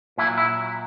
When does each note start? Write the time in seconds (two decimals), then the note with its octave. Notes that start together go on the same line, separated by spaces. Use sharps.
0.18 A#2 F#3 E4
0.38 E4